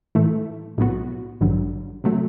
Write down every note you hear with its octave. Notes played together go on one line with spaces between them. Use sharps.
A2 E3 A3
B1 A2 F#3 B3 F#4
A1 G2 D3 F#3
C3 F#3 A3